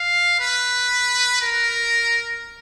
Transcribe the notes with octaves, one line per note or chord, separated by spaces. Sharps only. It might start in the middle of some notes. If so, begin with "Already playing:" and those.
Already playing: F5
B4
A#4